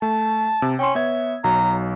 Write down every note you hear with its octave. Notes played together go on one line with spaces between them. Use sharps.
A3 A5
C3
C#4 G5 C6
B3 C#5 E5 G#6
B1 F#3 A#5